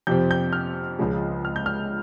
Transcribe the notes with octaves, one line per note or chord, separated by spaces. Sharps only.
F2 C3 F3 C4 G6
G6
F6
C#2 C#3 F3 G#3
F6
G6
F6